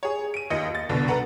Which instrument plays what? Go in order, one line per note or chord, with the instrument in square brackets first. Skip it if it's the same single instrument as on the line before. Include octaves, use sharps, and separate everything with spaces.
[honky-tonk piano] G#4 C#5
D7 D#7
D#2 F4 D#5 C#7
A6
C2 B2 D3
A4 B4 F#5 A#5